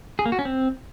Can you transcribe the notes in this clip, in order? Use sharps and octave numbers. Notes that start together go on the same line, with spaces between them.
G#4
A#3
F#4
C#4
C4